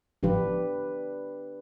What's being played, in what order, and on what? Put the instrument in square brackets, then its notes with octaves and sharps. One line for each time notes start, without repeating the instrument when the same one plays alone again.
[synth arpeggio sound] G1 A2 F3 [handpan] D4 G4 B4